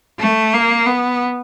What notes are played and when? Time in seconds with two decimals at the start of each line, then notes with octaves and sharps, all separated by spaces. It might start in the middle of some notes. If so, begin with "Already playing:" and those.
0.20 A3
0.54 A#3
0.86 B3